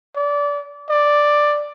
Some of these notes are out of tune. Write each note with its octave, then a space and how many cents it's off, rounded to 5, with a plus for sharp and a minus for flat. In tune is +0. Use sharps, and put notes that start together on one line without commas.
D5 -25
D5 +5